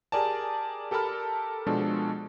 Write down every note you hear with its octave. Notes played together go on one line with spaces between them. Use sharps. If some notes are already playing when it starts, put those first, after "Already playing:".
G4 G#4 A#4 D5 G#5 A5
G4 A4 A#4 A5 B5 F6
B2 F3 G#3 D4 F#4 A4